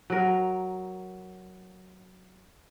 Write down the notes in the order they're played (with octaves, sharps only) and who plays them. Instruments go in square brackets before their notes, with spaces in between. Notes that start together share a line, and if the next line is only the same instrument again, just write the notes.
[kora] F#3 A#4